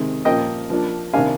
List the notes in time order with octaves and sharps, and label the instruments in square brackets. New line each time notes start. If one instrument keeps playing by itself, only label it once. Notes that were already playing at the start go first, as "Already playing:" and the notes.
Already playing: [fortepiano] C3 D#3 G#3 C4
A#2 F3 A#3 D#5 G5
F3 A#3 D4
C3 D#3 A#3 D4 F5 G#5